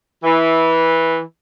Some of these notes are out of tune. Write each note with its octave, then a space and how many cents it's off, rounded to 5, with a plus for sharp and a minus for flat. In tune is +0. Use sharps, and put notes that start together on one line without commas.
E3 -10